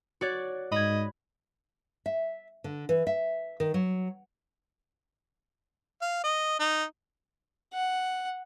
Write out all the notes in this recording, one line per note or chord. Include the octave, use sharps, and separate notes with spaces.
F#4 C#5 D5
G#2 D#5 B5 G#6
E5
D3
E3
E5
D#3
F#3
F5
D#5
D#4
F#5